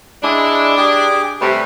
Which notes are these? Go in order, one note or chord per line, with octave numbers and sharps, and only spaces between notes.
G#3 D4 E4
G4 G#4 D6
C3 G3 A3 B4